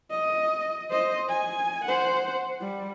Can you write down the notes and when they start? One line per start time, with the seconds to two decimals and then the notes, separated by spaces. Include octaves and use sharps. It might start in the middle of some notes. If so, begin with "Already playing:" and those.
0.11 D#5
0.90 C5 D#5
1.29 G#5
1.85 C5 F#5
2.61 G3